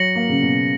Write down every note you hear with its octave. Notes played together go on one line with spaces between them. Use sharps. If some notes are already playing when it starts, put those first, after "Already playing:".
Already playing: F#3 A#6 C#7 F#7
A#3
C#3
B2